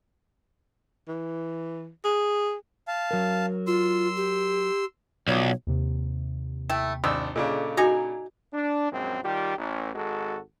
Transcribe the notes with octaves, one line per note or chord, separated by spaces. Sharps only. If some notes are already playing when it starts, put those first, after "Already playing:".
E3
G#4
F5 A5
F#3 A#4
F4 C6 E6
G4
B1 F#3 F4 C#5 D5
D#2 C3
A3 E4 G5
G#1 D4 D#4 E6
A#2 C#3 D4 G#4 A4 D#5
D#4 F#4 G#5 A#5
D4
A#1 F#2 G#3 C4
D#3 G3 F4 G4
A1
G#1 G#3 F#4 A4